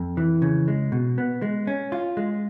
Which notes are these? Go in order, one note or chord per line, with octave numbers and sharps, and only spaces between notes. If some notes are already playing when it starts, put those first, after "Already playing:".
Already playing: F2
E3
C#3
G#3
B2
B3
G#3
C#4
F4
G#3